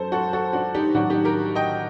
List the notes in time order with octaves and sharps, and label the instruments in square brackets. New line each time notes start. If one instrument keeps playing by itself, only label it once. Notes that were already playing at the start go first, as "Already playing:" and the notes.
Already playing: [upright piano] F#2 F#3 A4 C5
F#4 A4
F#4 A4
D4 F#4
D#4 G4
A1 G2 D#3 F#3 D4 F#4
D#4 G4
G4 A#4
D#5 G5